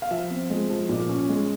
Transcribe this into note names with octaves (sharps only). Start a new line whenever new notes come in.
F5
F3 E5
C4
G#3
F3
A#2
C#4
G#3